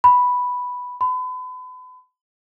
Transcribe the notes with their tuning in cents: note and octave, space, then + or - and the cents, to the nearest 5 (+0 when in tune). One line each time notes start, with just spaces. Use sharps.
B5 +0
B5 +35